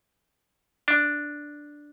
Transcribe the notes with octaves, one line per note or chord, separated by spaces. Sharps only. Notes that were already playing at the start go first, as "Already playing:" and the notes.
D4